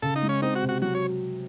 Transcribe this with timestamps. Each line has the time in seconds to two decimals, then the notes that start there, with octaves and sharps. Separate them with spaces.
0.02 C#3 A4
0.16 D#4
0.22 G#3
0.29 C#4
0.42 C4 D#4
0.55 F#4
0.62 C3
0.69 F#4
0.82 F#3 F#4
0.95 C#5